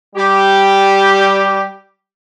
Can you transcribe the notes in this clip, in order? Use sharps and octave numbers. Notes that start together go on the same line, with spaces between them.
G3 G4